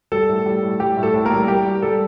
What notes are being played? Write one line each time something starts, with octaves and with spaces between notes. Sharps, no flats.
G3 A4
A2
G3
A2
G3 G4
A2
A4
A2
A#3 A#4
G3
G3 G4
G3
G3 A4